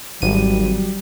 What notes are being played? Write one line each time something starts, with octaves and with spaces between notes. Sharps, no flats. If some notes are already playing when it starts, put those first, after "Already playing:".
G#1 F#3 G3 D#7